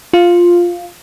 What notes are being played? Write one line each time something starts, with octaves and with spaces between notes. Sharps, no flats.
F4